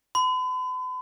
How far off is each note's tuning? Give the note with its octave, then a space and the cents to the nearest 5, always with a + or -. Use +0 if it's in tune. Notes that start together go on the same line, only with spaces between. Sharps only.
B5 +45